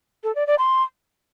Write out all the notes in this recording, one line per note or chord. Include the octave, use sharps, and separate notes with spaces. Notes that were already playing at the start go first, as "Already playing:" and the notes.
A4
D5
D5
C6